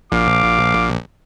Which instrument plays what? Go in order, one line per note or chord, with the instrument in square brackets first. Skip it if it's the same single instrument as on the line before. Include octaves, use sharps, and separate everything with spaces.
[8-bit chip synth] A#1 [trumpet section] F#4 F5 D6